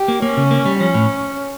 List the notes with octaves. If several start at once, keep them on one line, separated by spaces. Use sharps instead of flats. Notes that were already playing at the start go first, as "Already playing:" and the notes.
Already playing: G4
A#3
A#3 C#4
C#3
A#3
G3
F3 C#4
A2